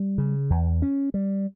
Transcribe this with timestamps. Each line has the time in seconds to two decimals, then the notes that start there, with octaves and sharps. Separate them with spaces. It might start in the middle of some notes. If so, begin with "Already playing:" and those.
Already playing: G3
0.18 C#3
0.50 E2
0.82 C#4
1.14 G3